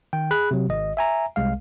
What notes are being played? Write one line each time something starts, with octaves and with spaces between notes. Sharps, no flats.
D#3 G5
G#4 B5 F#6
C3 F#3
G#1 D#5
E5 G#5 A#5
C2 G#3 F5